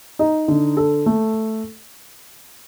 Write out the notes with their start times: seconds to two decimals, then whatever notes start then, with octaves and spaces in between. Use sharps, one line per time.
0.19 D#4
0.48 D3
0.77 A4
1.06 A3